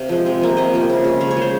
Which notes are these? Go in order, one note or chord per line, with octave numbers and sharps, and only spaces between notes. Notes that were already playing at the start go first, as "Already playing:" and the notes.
Already playing: C3 F5
F3 G#3
C3
F3 A#3
C3 D#5
F3 A#3
C#3
G#3
C#3 C#5
C#5
G#3 C5